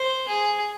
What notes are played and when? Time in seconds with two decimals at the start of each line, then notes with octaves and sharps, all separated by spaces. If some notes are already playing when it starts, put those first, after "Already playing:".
Already playing: C5
0.28 G#4